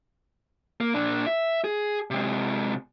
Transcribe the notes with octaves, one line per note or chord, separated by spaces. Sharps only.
A#3
A#2 D4
E5
G#4
C3 G#3